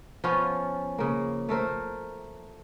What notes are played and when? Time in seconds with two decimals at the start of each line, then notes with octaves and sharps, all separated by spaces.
0.24 F3 B3 C#4 F4
0.98 C#3 A#3
1.49 A3 A4 A#4 C5